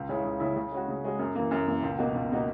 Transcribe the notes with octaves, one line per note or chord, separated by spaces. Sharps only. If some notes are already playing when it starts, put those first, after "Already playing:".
Already playing: C#2
C#3 G#3 C#4 E4
C#2
C#3 G#3 C#4 E4
C#3
G#3 C#4 F#4
C#3
G#3 C#4 F#4
F#2
E3 A#3
F#2
E3 A#3
C#2
B2 A#3 D#4 F#4
C#2
B2 A#3 D#4 F#4